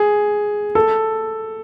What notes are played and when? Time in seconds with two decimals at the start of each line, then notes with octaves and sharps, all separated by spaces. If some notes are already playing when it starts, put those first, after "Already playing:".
Already playing: G#4
0.75 A4